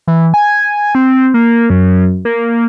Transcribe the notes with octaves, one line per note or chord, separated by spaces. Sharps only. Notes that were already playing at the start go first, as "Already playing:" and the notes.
E3
G#5
C4
A#3
F#2
A#3